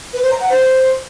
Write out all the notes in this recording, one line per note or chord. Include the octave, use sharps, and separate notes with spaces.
B4
C5
A#5
F#5
C5